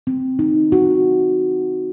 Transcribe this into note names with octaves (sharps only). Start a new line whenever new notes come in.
C4
D#4
F#4